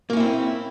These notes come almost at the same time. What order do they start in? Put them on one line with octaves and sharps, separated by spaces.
A#3 C#4 E4 C4